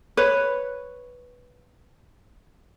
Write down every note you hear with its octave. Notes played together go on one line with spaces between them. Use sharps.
B4 C#5